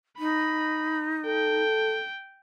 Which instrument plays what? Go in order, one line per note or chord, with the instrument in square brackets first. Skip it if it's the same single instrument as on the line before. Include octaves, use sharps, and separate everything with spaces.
[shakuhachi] D#4 [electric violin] B5
[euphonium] A4 [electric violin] G5